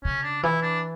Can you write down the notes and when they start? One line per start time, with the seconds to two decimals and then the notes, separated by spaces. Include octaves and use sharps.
0.04 C#3 C#4
0.23 D4
0.43 E3 E4
0.62 D4